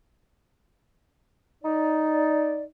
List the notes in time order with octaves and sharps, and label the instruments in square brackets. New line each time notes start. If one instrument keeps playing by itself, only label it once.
[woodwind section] D#4 D5